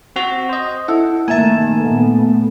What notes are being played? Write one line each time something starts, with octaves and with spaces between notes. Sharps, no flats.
C4 F#4
C5 D#5
E4 A4 F#5
C3 D#3 A3 A#3 E5 G#5 A5
A#2 A3 B3